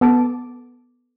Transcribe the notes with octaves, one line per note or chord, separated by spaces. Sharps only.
B3 A4 A5 D6